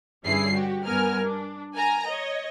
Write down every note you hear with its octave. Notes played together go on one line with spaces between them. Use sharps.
G2 D3 C#4 E4 G#4 C7
F#4 G4
G2 B3 A#4 G#5 F6
D4
A#4 G#5 A#5
C#5 D#5